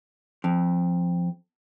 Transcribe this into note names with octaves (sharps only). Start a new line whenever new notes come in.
F2